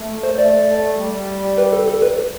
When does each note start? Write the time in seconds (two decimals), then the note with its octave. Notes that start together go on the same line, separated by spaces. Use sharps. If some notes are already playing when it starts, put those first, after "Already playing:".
Already playing: A3
0.23 C5
0.38 A3 D5
0.98 G3
1.58 B4
1.73 A4
1.88 A4
2.02 B4